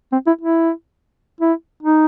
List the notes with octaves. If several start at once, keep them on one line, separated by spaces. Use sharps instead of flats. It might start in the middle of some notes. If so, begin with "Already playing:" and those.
C4
E4
E4
E4
D#4